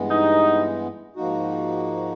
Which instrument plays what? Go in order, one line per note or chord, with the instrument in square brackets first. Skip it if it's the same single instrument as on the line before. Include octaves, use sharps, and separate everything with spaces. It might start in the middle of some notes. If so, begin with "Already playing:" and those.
Already playing: [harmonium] G2 E3 G#3 B3
[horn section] D#4
[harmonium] G#2 F3 A#3 D#4 F#4